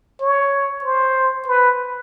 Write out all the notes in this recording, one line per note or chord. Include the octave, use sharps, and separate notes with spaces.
C#5
C5
B4